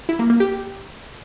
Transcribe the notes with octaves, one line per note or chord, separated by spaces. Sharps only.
E4
A#3
A#3
G4